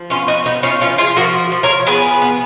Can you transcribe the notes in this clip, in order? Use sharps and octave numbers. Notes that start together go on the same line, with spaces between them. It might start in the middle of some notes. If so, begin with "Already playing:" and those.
Already playing: F3
B3 C#4 F4
D#4 F#4
B3 D#4
C#4 F4
F3 C#4 F4
F4 G#4
F3 F#4 A#4
F3
A#4 C#5
B3 G#4 B4
B3